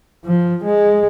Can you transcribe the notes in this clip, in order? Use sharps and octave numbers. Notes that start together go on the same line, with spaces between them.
F3
G#3